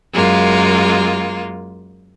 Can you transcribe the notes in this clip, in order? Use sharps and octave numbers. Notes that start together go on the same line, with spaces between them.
F#2 G#3 A#3 F4